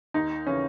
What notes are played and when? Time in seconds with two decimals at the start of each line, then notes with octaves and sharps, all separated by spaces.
0.14 D#2 D#4
0.47 C#3 E3 C#4